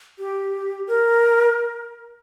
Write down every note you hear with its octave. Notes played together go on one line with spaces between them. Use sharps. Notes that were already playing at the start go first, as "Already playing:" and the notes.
G4
A#4